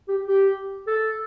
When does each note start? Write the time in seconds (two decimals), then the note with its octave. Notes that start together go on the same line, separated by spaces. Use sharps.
0.09 G4
0.28 G4
0.87 A4